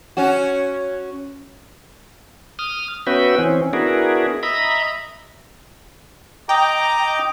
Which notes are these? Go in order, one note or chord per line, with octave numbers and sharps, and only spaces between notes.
C#4 F#4
D#6 F6
B3 C#4 F#4 B4 E5 G5
E3 C4 C#4
B3 D4 E4 F#4 G#4 A#4
D#5 E5 A#5 B5
D#5 G5 A#5 D6